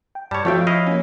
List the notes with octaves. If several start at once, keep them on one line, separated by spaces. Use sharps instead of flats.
G5
G2 G3 C#5 A5
F2 F3 A3 F4 F#4 C#5 G5
E4 D#5 F5
A#3 C#4